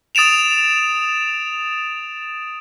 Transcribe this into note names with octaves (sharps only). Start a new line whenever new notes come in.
D#6 A6 D7 E7 F7